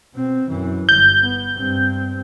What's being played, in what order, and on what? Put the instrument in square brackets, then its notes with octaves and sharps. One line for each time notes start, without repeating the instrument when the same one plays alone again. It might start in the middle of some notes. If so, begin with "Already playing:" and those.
[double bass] B2 C4
F#2 E3
[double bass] G1 [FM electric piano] G6
[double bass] B3
G2 C4